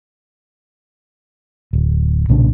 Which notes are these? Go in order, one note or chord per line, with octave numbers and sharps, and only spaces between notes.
D1
B1 A#2 C#3 D4